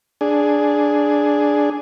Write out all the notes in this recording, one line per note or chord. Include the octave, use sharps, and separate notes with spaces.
D4 G#4